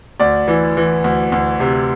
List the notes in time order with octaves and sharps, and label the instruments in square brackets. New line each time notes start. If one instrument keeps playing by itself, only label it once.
[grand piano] D2 D5
E3
E3
D2
D2
C3